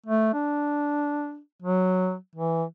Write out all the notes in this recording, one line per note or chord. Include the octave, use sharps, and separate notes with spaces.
A3
D4
F#3
E3